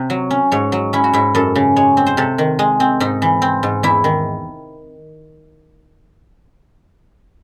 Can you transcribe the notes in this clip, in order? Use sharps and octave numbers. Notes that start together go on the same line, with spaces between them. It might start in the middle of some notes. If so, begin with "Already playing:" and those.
Already playing: C3 C4
F#3
C#4
G#2 C#5
F#3
C#4 E4
F#4
G#2 E4
F#2 A4
C#3
G#3 C#5
C4
C5
C3 A4
D#3
G#3
C4
G#2 D#4
E3
C4
G#2
E2 E4
D#3